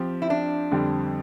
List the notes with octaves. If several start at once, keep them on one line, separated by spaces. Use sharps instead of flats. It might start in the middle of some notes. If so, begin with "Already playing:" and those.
Already playing: F3 C4 G4
E4
D4
F2 D3 G3 C4 G4